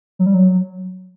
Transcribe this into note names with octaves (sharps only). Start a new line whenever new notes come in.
F#3
G3
F#3